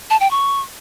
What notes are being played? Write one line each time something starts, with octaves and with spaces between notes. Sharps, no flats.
A5
G5
C#6